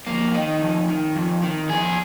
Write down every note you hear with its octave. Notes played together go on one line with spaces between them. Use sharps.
F2 A#3
D#3 D#4
F2
D#3
F2
D#3
F2 G#4